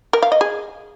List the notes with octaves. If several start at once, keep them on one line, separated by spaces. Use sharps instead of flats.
A#4
F5
D#5
G#4